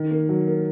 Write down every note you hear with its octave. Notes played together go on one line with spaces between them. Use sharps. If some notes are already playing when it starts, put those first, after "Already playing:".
Already playing: D#3
A#3
F#3
A#3